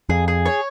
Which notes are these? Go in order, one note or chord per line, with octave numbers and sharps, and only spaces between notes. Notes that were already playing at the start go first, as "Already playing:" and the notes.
F2 G#4
G#4
C#5